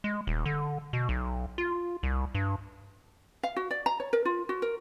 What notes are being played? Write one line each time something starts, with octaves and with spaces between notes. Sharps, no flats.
G#3
D#1
D3
B2
B1
F4
C2
G2
F5
F#4
D5
A#5
C#5
A#4
F4
F#4
A#4